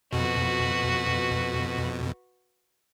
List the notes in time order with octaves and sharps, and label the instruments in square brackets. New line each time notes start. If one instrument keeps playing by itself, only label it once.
[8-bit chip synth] F2 B2 [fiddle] F#4 B4